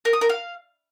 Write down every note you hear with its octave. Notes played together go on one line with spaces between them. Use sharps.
A#4
D#6
A#4
F5